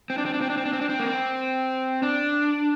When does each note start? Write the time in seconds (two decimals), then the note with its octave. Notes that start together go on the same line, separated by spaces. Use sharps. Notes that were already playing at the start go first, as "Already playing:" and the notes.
0.10 C4
0.18 D4
0.25 C4
0.34 D4
0.41 C4
0.50 D4
0.57 C4
0.65 D4
0.73 C4
0.81 D4
0.89 C4
1.00 A#3
1.06 C4
2.03 D4